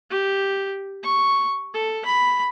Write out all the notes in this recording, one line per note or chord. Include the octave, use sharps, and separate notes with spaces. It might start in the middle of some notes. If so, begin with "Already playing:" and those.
G4
C#6
A4
B5